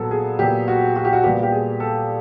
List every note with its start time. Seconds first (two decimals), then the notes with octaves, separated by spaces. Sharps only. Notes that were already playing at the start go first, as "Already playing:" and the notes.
Already playing: A#2 F#3 B3 A4
0.11 G#4
0.39 A#2 F#3 B3 G4
0.68 F#4
0.96 F#4
1.05 G4
1.13 F#4
1.24 A#2 G3 B3 G4
1.43 G4
1.52 G#4
1.80 A4